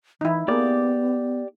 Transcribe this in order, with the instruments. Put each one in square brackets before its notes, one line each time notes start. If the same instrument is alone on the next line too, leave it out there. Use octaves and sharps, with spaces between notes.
[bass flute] E3 [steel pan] D#4 E4
[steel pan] A#3 G#4 [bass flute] B3 [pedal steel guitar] G4 D5 D6